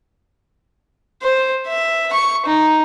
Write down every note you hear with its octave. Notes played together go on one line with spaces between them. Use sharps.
C5
E5
C#6
D#4